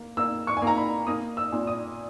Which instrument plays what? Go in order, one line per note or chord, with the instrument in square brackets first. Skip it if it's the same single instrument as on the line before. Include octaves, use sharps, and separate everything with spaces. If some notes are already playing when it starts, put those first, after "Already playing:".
Already playing: [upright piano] A#3
A#3 E6
C#6
G#5
A#3
A#5
B5
A#3 D#6
E6
A#2
D#6